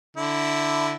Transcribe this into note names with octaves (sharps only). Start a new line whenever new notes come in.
D3 E4